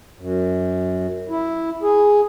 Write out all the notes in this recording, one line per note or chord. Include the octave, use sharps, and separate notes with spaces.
F#2
E4
G#4